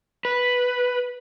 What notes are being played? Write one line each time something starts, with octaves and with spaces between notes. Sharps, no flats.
B4